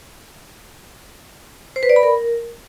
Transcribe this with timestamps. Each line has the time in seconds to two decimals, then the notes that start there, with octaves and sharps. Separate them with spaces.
1.76 C5
1.83 B4
1.90 D5
1.96 B5
2.03 A#4